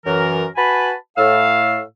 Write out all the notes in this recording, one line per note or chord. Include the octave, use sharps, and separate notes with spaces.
F#2 E3 A#4
F#4 B4 G#5 A5 B5
A2 F5 E6